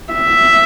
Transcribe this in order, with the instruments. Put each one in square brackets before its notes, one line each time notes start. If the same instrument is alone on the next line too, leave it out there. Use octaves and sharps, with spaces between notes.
[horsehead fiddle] E5